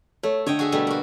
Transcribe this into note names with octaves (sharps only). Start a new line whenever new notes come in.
A3 C#5
D3 C#5 D#5 G5
F#4 G#4 E5
B2 G3 A3
A#3 F#4